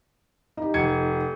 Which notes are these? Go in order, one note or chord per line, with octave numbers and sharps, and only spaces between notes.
D#4 G4
F1 G#6 C#7